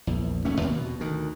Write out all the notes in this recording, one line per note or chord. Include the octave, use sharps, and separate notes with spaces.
A#1 E2
F1 A#1 A3 C#4
D#2 C3 A#3
B2
D2 D#3